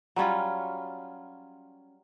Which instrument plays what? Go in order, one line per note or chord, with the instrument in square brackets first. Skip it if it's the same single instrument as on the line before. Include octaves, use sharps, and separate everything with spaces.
[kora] F#3 G3 C#4 F4